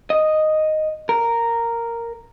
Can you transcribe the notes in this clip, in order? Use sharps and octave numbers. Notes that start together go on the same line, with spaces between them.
D#5
A#4